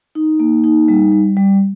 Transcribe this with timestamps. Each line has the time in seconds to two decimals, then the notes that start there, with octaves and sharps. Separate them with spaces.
0.15 D#4
0.40 A#3
0.64 D#4
0.88 G3
1.12 G3
1.37 G3